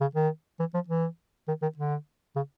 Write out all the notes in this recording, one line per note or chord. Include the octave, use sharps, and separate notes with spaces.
C#3
D#3
E3
F3
E3
D#3
D#3
D3
C#3